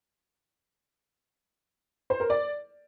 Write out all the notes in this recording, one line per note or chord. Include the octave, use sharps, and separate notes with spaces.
C5
A#4
D5